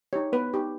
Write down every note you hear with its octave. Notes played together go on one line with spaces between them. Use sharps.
D#4 G4 C#5
B3 B4
D#4 G4